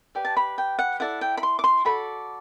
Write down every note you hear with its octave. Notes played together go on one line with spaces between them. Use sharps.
G4 B4 D5
A5
B5
G5
F#5
E4 A4 D5 F#5
G5
B5
C6
D6
C6
F#4 A4 D5 B5